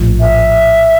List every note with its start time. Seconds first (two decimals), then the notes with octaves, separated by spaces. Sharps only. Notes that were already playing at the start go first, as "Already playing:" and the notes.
Already playing: A#1 A2 F3
0.20 E5